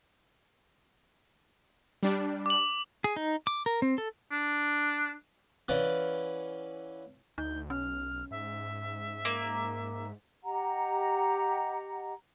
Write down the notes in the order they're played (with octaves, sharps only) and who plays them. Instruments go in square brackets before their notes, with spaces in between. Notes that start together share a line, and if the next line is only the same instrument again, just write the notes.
[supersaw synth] G3 D4
[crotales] D6 F#7
[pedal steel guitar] G#4
D#4
D6
A#4
C4
A4
[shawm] D4
[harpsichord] E3 C#4 D5 F5 F#5
[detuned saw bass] D2 [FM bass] D#4 [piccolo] G6
[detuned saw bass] B1 [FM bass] C#4 [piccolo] F6
[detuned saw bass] G#2 [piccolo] E5
[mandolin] A#3
[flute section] G4 D#5 F#5 A#5